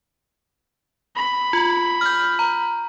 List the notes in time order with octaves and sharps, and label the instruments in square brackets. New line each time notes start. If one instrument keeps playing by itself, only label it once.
[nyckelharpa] B5
[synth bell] F4
F6 G6
A#5